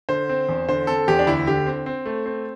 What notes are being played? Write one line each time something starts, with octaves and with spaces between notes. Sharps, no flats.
D3 C5
C4
E2
D3 C5
C4 A4
E2 G4
D4
D2 E4
D3 G4
C4
C4
A3
C4